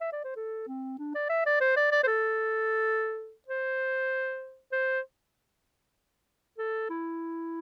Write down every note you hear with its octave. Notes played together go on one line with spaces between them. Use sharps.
E5
D5
C5
A4
C4
D4
D5
E5
D5
C5
D5
D5
C5
A4
C5
C5
A4
E4